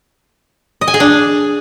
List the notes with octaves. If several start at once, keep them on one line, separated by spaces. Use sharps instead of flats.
D#5
G#5
G#4
D4